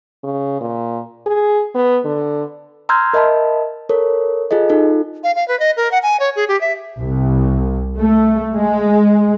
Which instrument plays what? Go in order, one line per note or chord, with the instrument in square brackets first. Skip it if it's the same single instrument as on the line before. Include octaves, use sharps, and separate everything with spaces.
[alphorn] C#3
A#2
G#4
B3
D3
[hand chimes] A#5 C6 E6 F6 G6 G#6
A#4 D#5 E5 A5 B5
A4 A#4 C#5
F4 G#4 A4 D#5
D#4 F4 A4
[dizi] F5
F5
B4
D#5
A#4
F#5
G#5
C#5
G#4
G4
E5
[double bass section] C2
A3
G#3